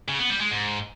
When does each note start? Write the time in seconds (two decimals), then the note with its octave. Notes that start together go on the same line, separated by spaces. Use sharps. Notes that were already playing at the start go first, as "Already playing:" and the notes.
0.08 C#3
0.19 B3
0.30 G3
0.40 G#3
0.51 G#2